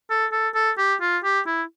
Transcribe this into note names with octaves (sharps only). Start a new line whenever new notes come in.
A4
A4
A4
G4
F4
G4
E4